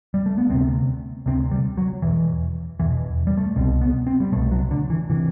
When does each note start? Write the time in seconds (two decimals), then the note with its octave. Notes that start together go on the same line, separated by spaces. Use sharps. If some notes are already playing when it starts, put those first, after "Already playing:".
0.14 G3
0.26 A3
0.38 B3
0.50 D2 C3 C4
1.26 D2 C3 C4
1.51 G3
1.77 F#3
2.02 E2 B2 E3
2.80 E2 B2 E3
3.27 G3
3.37 A3
3.56 C2 B2 C4
3.81 B3
4.07 C4
4.20 G3
4.32 C2 B2 A3
4.51 F#3
4.71 D3
4.90 E3
5.10 C3 E3